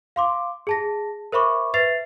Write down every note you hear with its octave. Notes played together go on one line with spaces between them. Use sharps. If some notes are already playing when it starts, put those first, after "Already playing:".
F5 C6 D6
G#4 A5 A#6
A#4 C5 E5 B5 C#6 D6
B4 E5 A6 C7 F7